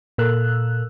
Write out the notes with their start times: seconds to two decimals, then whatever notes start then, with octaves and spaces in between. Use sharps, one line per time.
0.18 A#2 A4 A#4 E6 F#6